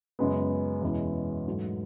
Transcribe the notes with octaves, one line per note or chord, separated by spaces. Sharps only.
F#2 C#3 G#3 B3
E2 B2 G#3 C#4 E4
G#2 F#3 A3